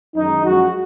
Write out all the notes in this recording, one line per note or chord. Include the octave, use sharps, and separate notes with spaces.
F#2 D#3 G#3 D#4
F#2 F3 G#3 F#4